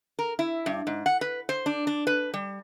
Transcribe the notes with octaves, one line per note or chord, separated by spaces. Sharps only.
A#4
E4
G2
G#2
F#5
B4
C5
D4
D4
B4
G3